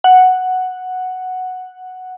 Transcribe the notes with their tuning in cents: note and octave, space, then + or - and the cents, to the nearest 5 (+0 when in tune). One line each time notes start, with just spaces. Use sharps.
F#5 +0